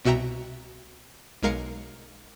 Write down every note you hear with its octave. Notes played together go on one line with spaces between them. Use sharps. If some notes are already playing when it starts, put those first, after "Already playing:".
C2 B2 F#4 E5 G5 A#5
B1 G#3 A#4 F5 C#7